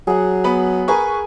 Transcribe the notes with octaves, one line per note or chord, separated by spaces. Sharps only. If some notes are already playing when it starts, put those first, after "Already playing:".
F#3 G#4 F#5
B3 B5
G#4 A#4 B4 G#5 C#6